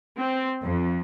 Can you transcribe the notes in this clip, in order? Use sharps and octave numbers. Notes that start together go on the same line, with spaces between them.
C4
F2